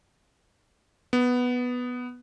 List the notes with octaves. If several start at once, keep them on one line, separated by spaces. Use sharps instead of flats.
B3